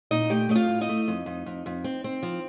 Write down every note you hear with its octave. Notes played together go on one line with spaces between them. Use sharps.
A#2 D#4 D#5
A3 G4 G5
A3 D#5
F4 F5
A2
D#4 D#5
A3
F2
F2
F2
F2
C4
C4
F3